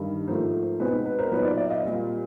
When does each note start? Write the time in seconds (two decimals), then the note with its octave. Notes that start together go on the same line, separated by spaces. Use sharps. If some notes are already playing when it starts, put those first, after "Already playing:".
Already playing: G2 D#3 G3
0.28 G#2 F3 A3 A#4 C5
0.80 B2 G#3 C4 D#4 B4
1.06 B4
1.19 A#4 C5
1.31 A#2 F#3 B3 D#4 B4 C#5
1.45 C5 D5
1.57 D5 E5
1.70 D#5 F5
1.83 A#2 G3 C4